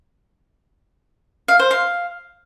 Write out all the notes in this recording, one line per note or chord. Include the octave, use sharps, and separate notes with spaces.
F5
C5
F5